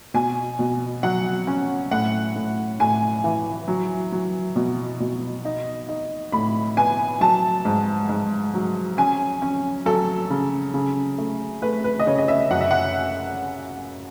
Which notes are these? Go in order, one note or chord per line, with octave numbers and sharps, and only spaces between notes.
B2 G#5
B2
F#3 F#5
C#4
A2 F#5
A2
A2 G#5
E3
F#3
F#3
B2
B2
D#4
D#4
A2 B5
B3 G#5
F#3 A5
G#2
G#2
F#3
C#4 G#5
C#4
F#3 A4
C#3
C#3
A3
A3 B4
B4
D#5
C#3 C#5
D#5
E5
F#2 F#5
E5
F#5